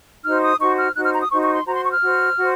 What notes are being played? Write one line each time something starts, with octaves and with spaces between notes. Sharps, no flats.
D#4 F#4 C5 F6
D#6
D#4 F#4 C5 C#6
F6
D#4 F#4 C5 F#6
F6
A#5
D#6
D#4 F#4 C5 C#6
C#6
C6
F#4 C5 A#5
C6
C#6
F6
F#4 C5
F#4 C5